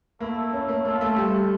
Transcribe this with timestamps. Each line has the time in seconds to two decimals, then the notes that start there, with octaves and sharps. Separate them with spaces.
0.20 A3 A#3 E4 A4
0.53 C#4
0.68 A#3
0.85 A#3 F4 A4 E5
1.01 A3
1.17 G3